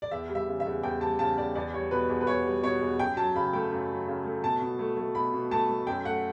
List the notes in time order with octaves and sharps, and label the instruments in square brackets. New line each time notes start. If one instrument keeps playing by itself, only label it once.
[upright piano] D5
E2 E5
G3
E5
C#3
E5
E2
E2 G5
G3 A5
C#3 A5
E2 D5
E2 D5
G3 C#5
B2 B4
E2
B4
E2 C#5
G3
B2 C#5
E2
F#2 G5
F#3 A5
C#3 B5
A3 G5
F#2
F#3
C#3
A3
B2 A5
B2
A3
A3
B2 B5
B2
A3 A5
A3
F#2 G5
A3 F#5